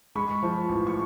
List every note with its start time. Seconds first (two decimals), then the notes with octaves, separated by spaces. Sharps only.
0.15 G#3 B5 C#6
0.43 F3
0.69 A1
0.87 C#6